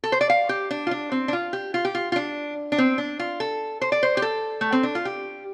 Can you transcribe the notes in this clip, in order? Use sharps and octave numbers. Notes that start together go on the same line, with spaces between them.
A4
C5
D5
F5
G4
D4
F4
D4
C4
D4
F4
G4
F4
G4
F4
F4
D4
D4
C4
D4
F4
A4
C5
D5
C5
G4
A4
A3
C4
D4
F4
G4